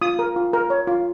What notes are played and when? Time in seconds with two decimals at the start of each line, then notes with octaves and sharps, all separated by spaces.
0.02 F4 D#6
0.19 A#4
0.36 F4
0.53 A#4
0.70 C#5
0.87 F4